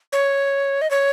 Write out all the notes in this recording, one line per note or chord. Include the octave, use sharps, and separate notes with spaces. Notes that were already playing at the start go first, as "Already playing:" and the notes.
C#5
D#5
C#5